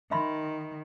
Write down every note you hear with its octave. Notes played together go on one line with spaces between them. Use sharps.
D#3 E5 B5 C6